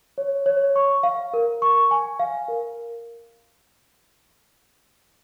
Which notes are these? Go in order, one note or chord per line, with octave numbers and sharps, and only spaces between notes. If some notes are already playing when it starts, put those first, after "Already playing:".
C#5
C#5
C#6
F5
A#4
C#6
G#5
F5
A#4